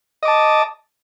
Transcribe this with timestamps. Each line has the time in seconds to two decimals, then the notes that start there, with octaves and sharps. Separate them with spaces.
0.23 D#5
0.25 D6
0.28 A5